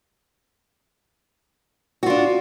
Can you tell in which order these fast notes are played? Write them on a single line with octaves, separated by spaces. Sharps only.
F#4 F4 D4